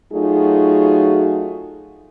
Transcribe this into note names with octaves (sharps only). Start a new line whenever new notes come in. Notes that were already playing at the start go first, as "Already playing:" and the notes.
F#3 A3 D#4 F4 F#4 G#4